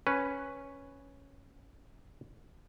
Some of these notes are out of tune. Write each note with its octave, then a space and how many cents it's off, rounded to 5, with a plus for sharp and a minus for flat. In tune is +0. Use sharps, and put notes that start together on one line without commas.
C#4 +0 B4 +0